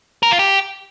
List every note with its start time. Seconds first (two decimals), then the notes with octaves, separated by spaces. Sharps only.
0.23 A#4
0.31 F4
0.39 G4